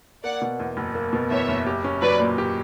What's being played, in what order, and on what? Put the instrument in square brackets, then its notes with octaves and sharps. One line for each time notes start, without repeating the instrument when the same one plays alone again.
[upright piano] A#3 [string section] D5 F#5
[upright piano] B2
E2
F#1
A#3
B2
[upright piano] E2 [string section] C#5 E5
[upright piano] F#1
G4
C#4
[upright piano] F#3 [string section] B4 D5
[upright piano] A#2
G4